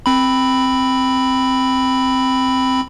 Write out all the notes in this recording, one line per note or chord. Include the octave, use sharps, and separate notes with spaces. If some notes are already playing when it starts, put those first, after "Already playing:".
C4 B5